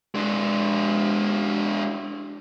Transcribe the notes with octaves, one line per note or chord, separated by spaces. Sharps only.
G#3 D4